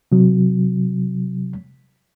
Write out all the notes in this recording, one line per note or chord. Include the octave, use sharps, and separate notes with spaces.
C3 F#3